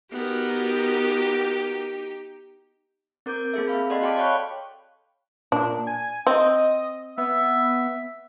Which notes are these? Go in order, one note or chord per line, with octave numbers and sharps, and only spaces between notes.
B3 D#4 F#4 G4 A#4
C4 A#4 D6 G6
A#3 C4 G#4 A4 E5
C4 G#4 F5 B5
A4 D5 D#5 F#5 C6
F#4 F5 G5 A5 C6 D6
C#5 F5 G5 B5 C#6 F#6
A#2 D4
G#5
C4 D#5
B3 E5